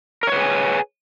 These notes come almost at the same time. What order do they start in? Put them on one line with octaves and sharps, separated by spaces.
A#4 C#5 B4 G#4 G#5